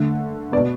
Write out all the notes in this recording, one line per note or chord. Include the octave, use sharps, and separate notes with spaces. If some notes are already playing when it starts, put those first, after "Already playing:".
Already playing: D3 A3
B2 B3 D5